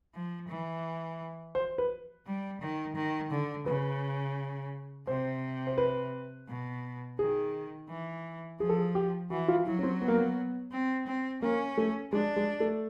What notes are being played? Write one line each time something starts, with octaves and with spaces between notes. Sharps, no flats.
F3
E3
C5
B4
G3
D#3
D#3
D3
C#3 B4
C3 C5
C5
B4
B2
D#3 G#4
E3
F3 G#4
A4
G#4
G4
E3 F#4
F4
F#3 E4
C#4
C4
B3
A#3
B3
C4
C4
A#3 C#4
A3
G#3 D4
G#3
A3